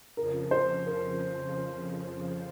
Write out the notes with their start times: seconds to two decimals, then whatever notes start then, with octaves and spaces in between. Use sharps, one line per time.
0.17 F2 C#3 F3 A#4
0.51 C5
0.87 A#4